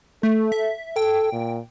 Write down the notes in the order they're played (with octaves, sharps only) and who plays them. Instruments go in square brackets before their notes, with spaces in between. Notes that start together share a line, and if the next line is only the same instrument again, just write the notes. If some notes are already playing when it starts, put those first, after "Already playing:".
[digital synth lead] A3 [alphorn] A4
[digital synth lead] E5
[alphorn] A4 [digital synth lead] G5
[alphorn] A#2